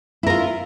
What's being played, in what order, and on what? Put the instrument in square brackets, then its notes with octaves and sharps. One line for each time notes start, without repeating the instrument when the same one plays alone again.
[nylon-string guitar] E4
A#4
F4